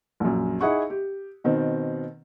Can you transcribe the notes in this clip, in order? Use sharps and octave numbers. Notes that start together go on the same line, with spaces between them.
A#1 F#2
D#4 E4 G#4 F#5 C#6
G4
B2 D#3 C4